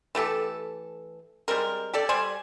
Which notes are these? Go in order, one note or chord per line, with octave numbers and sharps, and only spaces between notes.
E3 A3 G4 A4
G3 G#3 C4 A#4
G4 A4 D5
G3 C5 D5 G#5